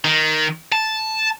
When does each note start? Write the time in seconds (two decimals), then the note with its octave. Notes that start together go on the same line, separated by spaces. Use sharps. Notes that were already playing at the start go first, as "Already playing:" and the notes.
0.05 D#3
0.72 A5